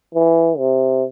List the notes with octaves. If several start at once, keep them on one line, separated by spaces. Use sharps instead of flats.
E3
C3